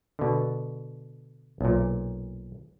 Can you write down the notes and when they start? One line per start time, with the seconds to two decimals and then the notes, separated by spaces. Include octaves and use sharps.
0.19 B2 D3
1.61 B1 A#2